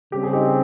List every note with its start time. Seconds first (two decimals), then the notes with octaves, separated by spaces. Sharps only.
0.12 C#3 G3 C4 G4
0.23 G#4
0.33 D#4 G4